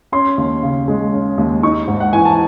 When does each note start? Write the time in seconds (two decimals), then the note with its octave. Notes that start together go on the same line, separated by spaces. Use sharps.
0.12 C#4 C6
0.38 D#2
0.63 C#3
0.88 G#3
1.12 C#4
1.38 D#2
1.63 D#4 C#6
1.87 G#2
2.00 F#5
2.13 E3 G#5
2.25 A5